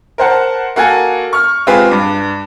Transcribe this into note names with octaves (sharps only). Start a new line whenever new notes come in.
A#4 C5 F#5 A5
A#3 F#4 A4 G#5
C#6 F6
G#3 C4 F4 G4 G#4 B4
G2 D6